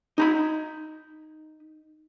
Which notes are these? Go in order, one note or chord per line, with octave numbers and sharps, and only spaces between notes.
D#4 A#5 B5